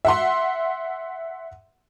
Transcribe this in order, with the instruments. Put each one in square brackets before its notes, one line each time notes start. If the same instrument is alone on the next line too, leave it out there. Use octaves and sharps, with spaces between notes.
[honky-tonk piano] E5 F#5 C6